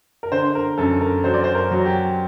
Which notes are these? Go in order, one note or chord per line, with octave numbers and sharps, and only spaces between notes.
A#4
D3 C5
A#4
F#2 A4
A#4
F#3 C5
D5
C5
A#4
F#3
G4